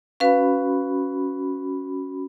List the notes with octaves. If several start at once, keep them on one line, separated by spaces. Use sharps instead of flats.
C#4 F#4 B4 F5 B5